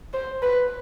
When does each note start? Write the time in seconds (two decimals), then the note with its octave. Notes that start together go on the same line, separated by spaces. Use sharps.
0.14 C5
0.42 B4